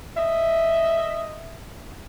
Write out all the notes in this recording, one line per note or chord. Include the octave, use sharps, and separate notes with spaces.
D#5 E5